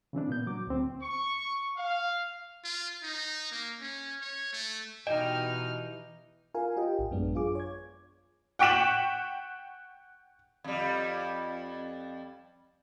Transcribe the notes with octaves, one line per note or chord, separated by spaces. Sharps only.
C#3 E3 C4 D4
A#2 B3 G6
F#3 D6
D2 C4
C#6
F5
F4
D#4
A#3
C#4
C#5
A3
B2 E3 D#4 G4 D#5 G5 F6
F4 A#4 F5 G#5
F4 G4 D#5 G5
A1
F#2 F#3 G#3 B3 D4
F4 G#4 D6
C#5 G#6
F#5 G5 C#6 B6 E7 F#7
F2 G3